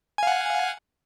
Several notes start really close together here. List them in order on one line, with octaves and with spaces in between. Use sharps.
G#5 F5 F#5